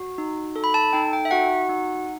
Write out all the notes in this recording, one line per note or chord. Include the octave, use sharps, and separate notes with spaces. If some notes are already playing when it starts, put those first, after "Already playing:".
Already playing: F#4
D#4
A4
B5
A5
D#4 G5
G5
E5
F#4 F#5
D#4